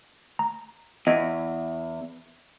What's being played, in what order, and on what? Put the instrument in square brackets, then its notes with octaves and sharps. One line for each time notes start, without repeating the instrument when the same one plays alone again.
[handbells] A#5
[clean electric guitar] E2 [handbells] D#5 G#6